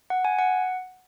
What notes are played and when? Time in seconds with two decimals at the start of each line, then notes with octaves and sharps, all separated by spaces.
0.10 F#5
0.25 G#5
0.39 F#5